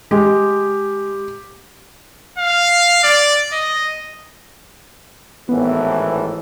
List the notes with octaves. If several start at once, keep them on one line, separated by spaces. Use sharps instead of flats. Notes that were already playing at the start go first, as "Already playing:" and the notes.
G#3 G4
F5
D5
D#5
G#1 A2 E3 B3